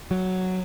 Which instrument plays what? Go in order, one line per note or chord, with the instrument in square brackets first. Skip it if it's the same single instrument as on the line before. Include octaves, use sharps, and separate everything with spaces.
[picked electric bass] F#3